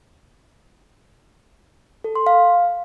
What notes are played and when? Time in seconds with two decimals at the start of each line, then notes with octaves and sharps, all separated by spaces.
2.04 A4
2.15 C6
2.27 F5